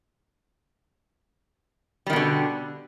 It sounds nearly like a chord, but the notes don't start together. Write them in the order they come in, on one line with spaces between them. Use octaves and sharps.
G3 D#3 B2 D3